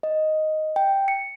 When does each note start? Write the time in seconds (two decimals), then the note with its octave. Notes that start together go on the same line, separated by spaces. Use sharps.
0.03 D#5
0.76 G5
1.08 C#7